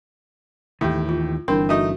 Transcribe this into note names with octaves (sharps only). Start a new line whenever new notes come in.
D#2 A2 D#3 E3 G4
F4
G1 G2 E3 C4 D4 A#4 C6
A3 D#4 F#4 D#5